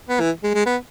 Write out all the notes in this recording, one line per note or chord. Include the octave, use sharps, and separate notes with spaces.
B3
E3
G#3
G#3
B3